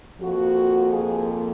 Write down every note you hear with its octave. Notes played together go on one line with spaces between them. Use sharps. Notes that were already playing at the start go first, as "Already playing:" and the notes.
F2 F3 A#3 F#4
G#4